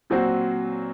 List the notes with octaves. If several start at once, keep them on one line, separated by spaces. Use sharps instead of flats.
A#2 F#3 C4 F#4 C5